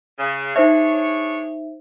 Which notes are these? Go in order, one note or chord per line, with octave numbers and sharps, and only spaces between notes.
C#3
D4 D#4 G#4 C5 C#5 E5